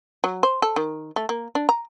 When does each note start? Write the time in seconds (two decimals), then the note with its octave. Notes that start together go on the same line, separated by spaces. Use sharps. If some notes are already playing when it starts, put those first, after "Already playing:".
0.24 F#3
0.43 C5
0.62 A4
0.76 D#3
1.16 A3
1.29 A#3
1.55 D4
1.69 A#5